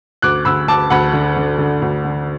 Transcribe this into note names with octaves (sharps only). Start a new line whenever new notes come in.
D2 D6 F#6
D2 B5 E6
D2 A5 D6
D2 F#5 B5
D3
D3
D3
D2
D3